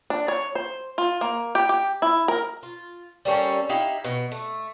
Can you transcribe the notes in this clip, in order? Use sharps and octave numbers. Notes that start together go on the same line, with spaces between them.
D4
C#5
C5
F4
A#3
G4
G4
E4
A#4
F4
G3 A#3 C#4 A4
D#4 E4 G4 F5
B2
A3